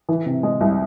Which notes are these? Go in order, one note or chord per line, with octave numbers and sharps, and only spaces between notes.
E3
C3
G#3
C2